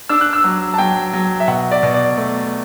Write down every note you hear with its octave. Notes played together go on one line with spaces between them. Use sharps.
D4 E6
F#6
E6
F#3
A5
F#3 G5
F#3
E5
B2 F#5
D5
B2
D5
A3